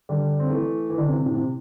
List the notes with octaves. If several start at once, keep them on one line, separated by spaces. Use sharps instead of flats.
D3 G3
C4
E3 A3
E3
D3
C3 E3
C3
A2
C3